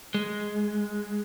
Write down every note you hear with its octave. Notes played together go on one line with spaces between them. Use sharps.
G#3